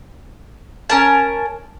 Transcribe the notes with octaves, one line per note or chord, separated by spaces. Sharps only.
C#4 A#4 A5